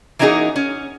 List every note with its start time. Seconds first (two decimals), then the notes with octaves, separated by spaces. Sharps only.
0.19 E3 A#3 C#4 D#4 F#4 G#4
0.56 C#4